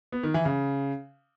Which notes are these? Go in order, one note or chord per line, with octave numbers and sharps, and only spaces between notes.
B3
D#3
E3
C#3